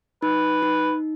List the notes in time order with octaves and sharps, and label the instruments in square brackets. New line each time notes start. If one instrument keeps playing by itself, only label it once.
[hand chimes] D#4 [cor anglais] B4
[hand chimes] D#4